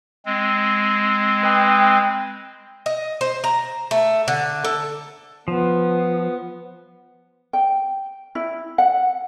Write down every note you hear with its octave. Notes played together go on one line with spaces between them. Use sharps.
G#3 C4
B4 D#5 G5
D#5
C5
A#5
A3
D3
A4
F3 B3
G5
E4
F#5